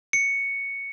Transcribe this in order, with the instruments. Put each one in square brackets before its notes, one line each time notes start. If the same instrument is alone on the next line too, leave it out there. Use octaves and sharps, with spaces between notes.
[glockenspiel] C#7